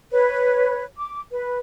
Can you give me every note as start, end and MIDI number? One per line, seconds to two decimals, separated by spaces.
0.11 0.84 71
0.11 0.84 73
0.98 1.21 86
1.31 1.58 71